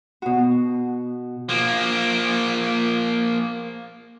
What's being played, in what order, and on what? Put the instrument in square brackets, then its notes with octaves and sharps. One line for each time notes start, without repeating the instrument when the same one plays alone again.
[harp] B2 F#4
[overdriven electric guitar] F3 A#3